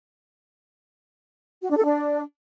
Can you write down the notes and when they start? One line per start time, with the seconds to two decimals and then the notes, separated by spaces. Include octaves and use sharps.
1.62 F#4
1.69 D4
1.77 A4
1.84 D4